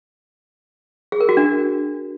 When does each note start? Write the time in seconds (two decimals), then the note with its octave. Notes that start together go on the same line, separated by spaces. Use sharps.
1.12 G#4
1.20 A#4
1.29 F#4
1.37 D4